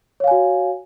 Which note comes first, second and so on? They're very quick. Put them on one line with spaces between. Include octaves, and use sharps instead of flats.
C#5 F5 G#5 F#4